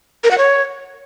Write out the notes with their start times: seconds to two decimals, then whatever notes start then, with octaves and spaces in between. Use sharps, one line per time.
0.24 A#4
0.31 F#5
0.38 C#5